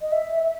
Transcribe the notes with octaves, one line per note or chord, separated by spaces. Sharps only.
D#5
E5